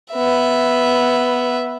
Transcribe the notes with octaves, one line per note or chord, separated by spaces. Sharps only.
B3 E5